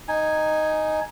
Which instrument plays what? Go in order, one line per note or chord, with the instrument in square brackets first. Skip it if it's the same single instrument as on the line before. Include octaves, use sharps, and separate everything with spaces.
[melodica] D#4 G#5